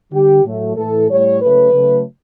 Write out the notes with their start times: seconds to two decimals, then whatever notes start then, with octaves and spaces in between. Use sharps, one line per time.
0.12 D3 G3 G4
0.44 A2 F#3 A3
0.76 A2 E3 A3 A4
1.09 A2 G3 C#5
1.41 C#3 F#3 A3 B4
1.73 C#3 F#3 A3